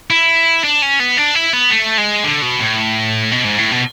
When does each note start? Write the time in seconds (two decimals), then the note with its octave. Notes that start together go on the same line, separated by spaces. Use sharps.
0.10 E4
0.64 D4
0.82 C#4
1.00 B3
1.17 D4
1.35 E4
1.53 B3
1.71 A3
1.98 G#3
2.24 D3
2.42 B2
2.60 A2
3.32 B2
3.44 G#2
3.58 A2
3.72 B2